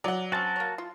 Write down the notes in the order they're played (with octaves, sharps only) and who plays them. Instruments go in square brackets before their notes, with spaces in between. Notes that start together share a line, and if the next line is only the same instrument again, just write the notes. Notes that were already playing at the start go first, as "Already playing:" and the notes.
[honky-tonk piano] F#3 [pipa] D5 F#5
[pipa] C4 C#4 [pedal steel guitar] F#4 A5
[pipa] A#3 C#5
F4